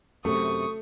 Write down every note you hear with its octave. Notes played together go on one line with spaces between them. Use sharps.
F#2 C3 A3 C#6 D#6